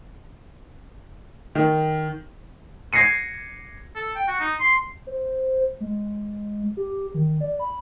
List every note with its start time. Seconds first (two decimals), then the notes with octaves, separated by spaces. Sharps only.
1.55 D#3
2.93 G#6 A#6 C7 C#7 D#7
3.95 A4
4.16 G5
4.28 F#4
4.40 D#4
4.60 C6
5.07 C5
5.80 G#3
6.77 G4
7.14 D#3
7.41 D5
7.60 B5